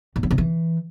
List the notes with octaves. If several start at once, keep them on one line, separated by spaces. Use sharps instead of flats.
A2
G2
C3
E3